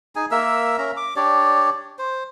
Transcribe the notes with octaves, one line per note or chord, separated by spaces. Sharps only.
D#4 G#4 G#5
A#3 A#4 E5 E6
C#4 A#4 E5 A#5
D6
D4 G4 C#5 D5
C5